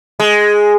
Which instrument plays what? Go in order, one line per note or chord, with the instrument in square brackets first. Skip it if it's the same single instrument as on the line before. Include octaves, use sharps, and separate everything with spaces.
[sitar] G#3